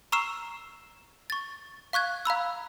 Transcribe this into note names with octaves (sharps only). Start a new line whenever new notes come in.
A#5 C#6 E6 F6 C7 E7
C#6 A6
F5 C#6 F#6 G#6
F5 A#5 B5 E6